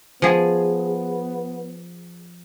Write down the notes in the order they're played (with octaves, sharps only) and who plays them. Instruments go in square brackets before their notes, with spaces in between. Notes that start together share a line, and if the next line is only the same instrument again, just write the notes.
[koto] F3 G#4 [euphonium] B3